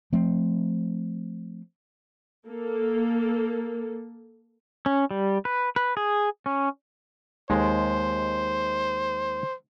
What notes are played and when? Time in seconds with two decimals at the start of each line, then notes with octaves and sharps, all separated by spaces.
0.13 F3 A3 C4
2.47 A#3 A4
4.86 C#4
5.11 G3
5.45 B4
5.76 B4
5.97 G#4
6.46 C#4
7.50 D#2 G#3 C5